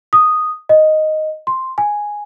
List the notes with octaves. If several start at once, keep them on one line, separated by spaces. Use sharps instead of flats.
D#6
D#5
C6
G#5